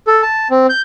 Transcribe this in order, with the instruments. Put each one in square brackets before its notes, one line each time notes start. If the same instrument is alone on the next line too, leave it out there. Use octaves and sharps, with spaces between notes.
[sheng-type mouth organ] A4
A5
C4
G6